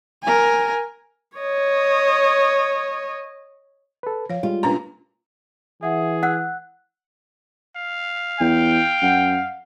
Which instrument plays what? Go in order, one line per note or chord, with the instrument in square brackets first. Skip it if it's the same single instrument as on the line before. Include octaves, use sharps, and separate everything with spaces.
[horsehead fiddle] A#4 G#5
[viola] C#5 D#5
[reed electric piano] A4 B4
[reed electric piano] F3 [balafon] C#5 F5
[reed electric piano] G3 G#3 [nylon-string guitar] F4
[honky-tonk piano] A#2 A#5 [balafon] C#4 D4 B4
[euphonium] E3 [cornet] G#4 [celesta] E5 F#5
[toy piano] F#5 E6 [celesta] F#6
[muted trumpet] F5
[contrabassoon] E2 [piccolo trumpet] G5
[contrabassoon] F#2 [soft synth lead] F#5